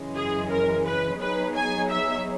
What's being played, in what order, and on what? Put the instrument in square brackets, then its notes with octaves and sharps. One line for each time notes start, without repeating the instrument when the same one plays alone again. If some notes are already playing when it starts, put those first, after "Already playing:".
Already playing: [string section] F#2 C#3 E3 G#3 C#4
[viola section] G#4
A#4
B4
[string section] F#3 B3 D#4 G#4 C#5 [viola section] B4
[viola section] G#5
E5